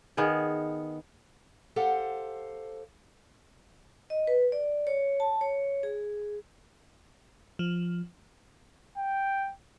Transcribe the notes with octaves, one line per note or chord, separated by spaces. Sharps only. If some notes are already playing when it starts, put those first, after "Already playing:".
D#3 B3 G#4
G4 A4 C5 F5 F#5
D#5
B4
D5
C#5
A5
C#5
G#4
F3
G5